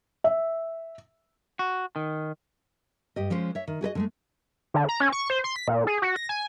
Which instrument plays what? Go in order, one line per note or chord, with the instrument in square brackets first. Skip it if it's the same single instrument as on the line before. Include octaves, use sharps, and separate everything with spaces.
[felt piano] E5
[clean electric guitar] F#4
D#3
[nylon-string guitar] G2 G4 D#5
F3 G#3 C#4 C5
C#5 E5
D#3
F#4 G#4 B4 D#5
D3 G#3 A3
[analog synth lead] D3
A#5
C#4
C#6
C5
C6
B6
A#2
G#4
F#4
A#6
G#5